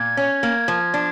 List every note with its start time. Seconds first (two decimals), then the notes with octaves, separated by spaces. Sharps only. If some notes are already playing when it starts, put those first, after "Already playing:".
Already playing: A#2 G#6
0.17 C#4
0.43 A#3
0.68 F3
0.94 D4